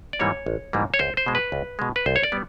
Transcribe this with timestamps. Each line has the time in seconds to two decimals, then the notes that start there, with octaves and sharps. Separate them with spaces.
0.13 D5
0.20 G#2 E3 G3 A#3 C#5
0.46 A1
0.73 G#2 E3 G3 A#3
0.94 C#5
0.99 C#2 C5
1.17 C5
1.26 B2 G#3
1.35 B4
1.52 C#2
1.79 B2 G#3
1.96 B4
2.06 C2 C5
2.16 C#5
2.23 D5
2.32 G3 B3